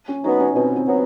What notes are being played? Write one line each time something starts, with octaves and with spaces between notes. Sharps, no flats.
C#4
F#3 B3 D#4
C#4
B2 C4
C4
F#3 B3